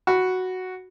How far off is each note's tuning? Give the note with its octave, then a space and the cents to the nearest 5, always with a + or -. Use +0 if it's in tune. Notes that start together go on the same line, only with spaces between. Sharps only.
F#4 +0 B5 +0